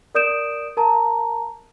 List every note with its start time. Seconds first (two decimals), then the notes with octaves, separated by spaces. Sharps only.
0.15 A#4 D5 D#6 G6 D7 E7
0.77 A#4 A5 A#5